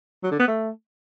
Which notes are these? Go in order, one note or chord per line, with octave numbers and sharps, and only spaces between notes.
F#3
D3
B3
A3